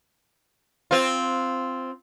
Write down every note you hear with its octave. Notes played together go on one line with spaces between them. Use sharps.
C4 F4